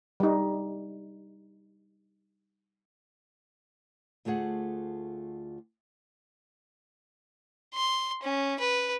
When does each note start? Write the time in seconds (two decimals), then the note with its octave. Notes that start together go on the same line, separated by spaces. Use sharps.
0.20 G3 D#4
4.25 D2 A3 F4 G#4 F#5
7.74 C6
8.23 C#4
8.60 B4